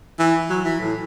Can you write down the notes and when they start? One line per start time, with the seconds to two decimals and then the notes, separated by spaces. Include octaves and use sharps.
0.19 E3
0.50 F#3
0.65 E3
0.80 A2